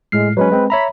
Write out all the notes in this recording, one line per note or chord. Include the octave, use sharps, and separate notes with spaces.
A2 G#3 F6 C7
F#3 G#3 C#4 B4
G#3 C4
C#5 E5 A#5 B5